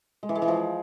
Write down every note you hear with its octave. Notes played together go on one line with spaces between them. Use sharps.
G#3
E3
G#3
E3
F3